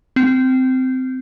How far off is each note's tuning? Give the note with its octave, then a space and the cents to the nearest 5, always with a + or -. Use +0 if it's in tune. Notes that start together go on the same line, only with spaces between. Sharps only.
C4 -15